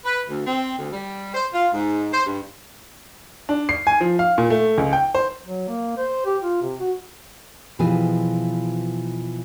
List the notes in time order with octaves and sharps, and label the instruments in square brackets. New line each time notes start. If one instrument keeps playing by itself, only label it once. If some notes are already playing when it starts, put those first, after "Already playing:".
[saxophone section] B4
D2
C4
D2
G3
C5
F4
G#2
C5
G2
[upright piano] D4
C7
G#5
F3
F5
A#2
A3
C#2
G5
C5
[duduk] F#3
A#3
C5
G4
F4
C3
F#4
[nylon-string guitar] B2 E3 F3 F4 G4 G#4